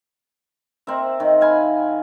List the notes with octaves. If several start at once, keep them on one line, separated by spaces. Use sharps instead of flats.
C4 A#4 E5
D#3
F5 G#5 B5